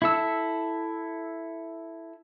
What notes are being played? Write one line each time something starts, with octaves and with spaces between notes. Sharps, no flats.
E4 A4 E6